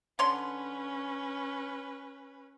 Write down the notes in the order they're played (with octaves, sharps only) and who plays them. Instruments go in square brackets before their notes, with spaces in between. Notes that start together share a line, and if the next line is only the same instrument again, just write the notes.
[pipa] D3 C#5 C6 [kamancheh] C#4 B4